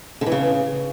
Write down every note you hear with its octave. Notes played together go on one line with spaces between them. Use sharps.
D3
E3
C#3